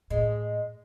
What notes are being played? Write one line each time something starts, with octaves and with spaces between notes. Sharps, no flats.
A2 G#3